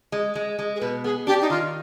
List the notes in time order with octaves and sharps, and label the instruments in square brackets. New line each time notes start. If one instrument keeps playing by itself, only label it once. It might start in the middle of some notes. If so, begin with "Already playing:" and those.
[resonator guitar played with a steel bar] G#3
G#3
G#3
[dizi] G#4
[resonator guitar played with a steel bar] B2 [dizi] B4
[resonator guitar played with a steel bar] B3 [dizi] G#4
[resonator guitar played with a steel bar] D4 [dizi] G4
[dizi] D#4
[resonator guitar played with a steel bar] D#3 [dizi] F4